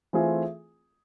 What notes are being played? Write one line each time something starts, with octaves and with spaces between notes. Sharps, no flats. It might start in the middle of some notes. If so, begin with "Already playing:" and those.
E3 A3 C4 F4 G#4